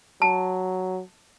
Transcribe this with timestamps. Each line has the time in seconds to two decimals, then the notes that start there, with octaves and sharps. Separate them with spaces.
0.22 F#3 A5